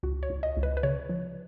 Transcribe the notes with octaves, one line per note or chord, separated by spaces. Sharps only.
C#2 F#4
C#5
C#2
D#5
C#2
B4
B4
C#3 C#5
F3